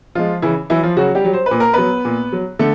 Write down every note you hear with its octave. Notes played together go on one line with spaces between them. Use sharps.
F3 G#3 F4
C#3 E3 E4
E3 F#3 E4
F3 F4
C#3 F#3 F#4
G3 G4
F#3
C5
A#2 B4
A#4
F#3 B3 B4
A#2
F#3
D3 A3 A4